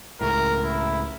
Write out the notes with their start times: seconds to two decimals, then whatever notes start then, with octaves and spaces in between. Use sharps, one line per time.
0.21 C#2 A2 A#4
0.63 E4